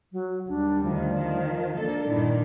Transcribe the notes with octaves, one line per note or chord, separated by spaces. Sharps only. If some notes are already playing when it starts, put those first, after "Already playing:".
F#3
D#2 G3 D4
D2 D#3 F3
D#3
A#3 D4 A4
G2 A#2 D#3 E4